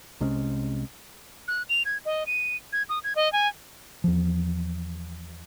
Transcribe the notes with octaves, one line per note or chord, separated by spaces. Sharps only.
C2 C3 G#3 C#4
F#6
F7
G#6
D#5
D#7
G#6
D#6
G#6
D#5
G#5
E2 F3